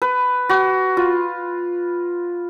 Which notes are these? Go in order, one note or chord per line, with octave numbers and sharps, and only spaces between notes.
B4
F#4
F4